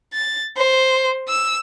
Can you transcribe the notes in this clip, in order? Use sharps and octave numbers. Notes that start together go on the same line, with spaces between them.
A6
C5
E6